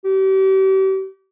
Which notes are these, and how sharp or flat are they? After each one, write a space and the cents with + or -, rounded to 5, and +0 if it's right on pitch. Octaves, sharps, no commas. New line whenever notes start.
G4 -40